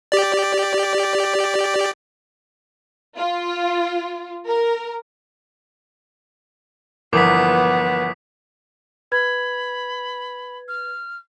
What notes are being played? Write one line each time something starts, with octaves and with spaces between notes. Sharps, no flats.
G4 D5
F4
A#4
G1 E3 F3 B3 A#4 D6 D#6 B6
B4 B5 G#6
F6